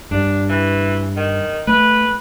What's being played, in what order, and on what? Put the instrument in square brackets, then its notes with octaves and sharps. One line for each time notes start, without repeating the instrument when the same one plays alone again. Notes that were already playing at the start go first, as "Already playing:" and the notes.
[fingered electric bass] G2 [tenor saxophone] D4
[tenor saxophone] E3
D#3
[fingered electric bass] A3 [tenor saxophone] B4